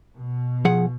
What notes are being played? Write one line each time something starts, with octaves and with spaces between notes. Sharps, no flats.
B2
F3 G#4 F#5